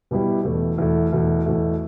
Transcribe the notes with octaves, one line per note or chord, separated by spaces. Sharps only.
B2 G3 B3 E4 G4
E2 B2 A3
E2 B2 A3
E2 B2 A3
E2 B2 A3